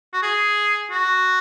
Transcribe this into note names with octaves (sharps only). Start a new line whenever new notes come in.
F#4
G#4
F#4